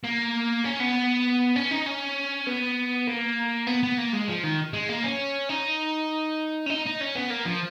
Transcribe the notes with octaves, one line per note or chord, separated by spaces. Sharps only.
A#3
C#4
B3
C#4
D#4
C#4
B3
A#3
B3
B3
A#3
G#3
F3
D#3
G#3
A#3
C#4
D#4
C#4
D#4
D#4
C#4
B3
A#3
F3